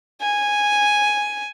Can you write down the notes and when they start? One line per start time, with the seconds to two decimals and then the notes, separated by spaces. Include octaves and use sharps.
0.22 G#5